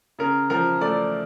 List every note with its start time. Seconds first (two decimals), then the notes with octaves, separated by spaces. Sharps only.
0.19 C#3 A#4
0.50 F3 A#4
0.81 A3 D5